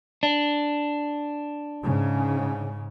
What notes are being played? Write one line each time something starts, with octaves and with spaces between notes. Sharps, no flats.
D4
G#2 C#3